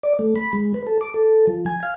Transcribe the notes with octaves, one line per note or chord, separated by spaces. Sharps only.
D5
A3
B5
G#3
B4
A4
D6
A4
F3
G#5
F5